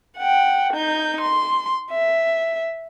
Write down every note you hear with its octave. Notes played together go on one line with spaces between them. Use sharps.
F#5 G5
D#4 G6
C6
E5